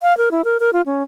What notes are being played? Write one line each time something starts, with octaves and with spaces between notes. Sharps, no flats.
F5
A#4
E4
A#4
A#4
F4
C#4